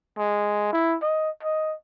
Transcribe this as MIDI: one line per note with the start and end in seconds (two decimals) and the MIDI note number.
0.18 0.71 56
0.72 0.96 64
1.02 1.30 75
1.43 1.74 75